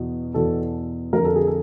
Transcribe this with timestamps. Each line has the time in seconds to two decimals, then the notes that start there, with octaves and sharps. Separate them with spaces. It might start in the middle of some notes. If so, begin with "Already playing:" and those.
Already playing: E2 B2
0.34 E2 B2 A4
1.13 F2 D3 A#4
1.24 A4
1.35 G#4
1.47 A4